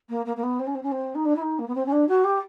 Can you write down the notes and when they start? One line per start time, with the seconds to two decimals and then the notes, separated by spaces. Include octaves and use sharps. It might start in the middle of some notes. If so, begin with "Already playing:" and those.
0.09 A#3
0.25 A#3
0.36 A#3
0.43 B3
0.59 C4
0.66 C#4
0.74 C4
0.82 C#4
0.91 C4
1.14 D#4
1.25 D4
1.36 E4
1.41 D#4
1.58 A#3
1.67 B3
1.75 C4
1.86 C#4
1.92 D4
2.08 F#4
2.24 G4